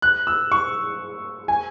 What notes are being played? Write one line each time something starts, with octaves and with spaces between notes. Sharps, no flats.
F#6
E6
C#6
G#5